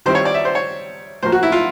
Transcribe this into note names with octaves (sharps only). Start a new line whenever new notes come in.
D#3 G3 C4 E4 C5
C#5
D5
E5
C5
C#5
A2 F3 A#3 C5
F#4
E4
F4